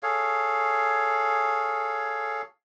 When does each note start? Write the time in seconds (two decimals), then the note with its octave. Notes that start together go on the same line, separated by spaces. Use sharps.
0.03 G#4 A4 C#5 F5